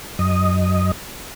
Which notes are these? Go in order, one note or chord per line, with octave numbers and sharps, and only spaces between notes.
F#2 D#5